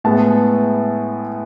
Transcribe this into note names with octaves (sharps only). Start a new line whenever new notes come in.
A2 G#3 B3 A5